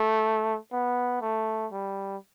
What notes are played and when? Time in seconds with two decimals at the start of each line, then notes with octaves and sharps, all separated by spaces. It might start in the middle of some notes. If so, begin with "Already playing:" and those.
Already playing: A3
0.72 B3
1.22 A3
1.72 G3